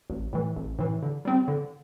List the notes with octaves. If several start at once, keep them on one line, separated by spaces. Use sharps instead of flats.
A1
A2 E3
A1
A2 E3
D3
G3 C4
D3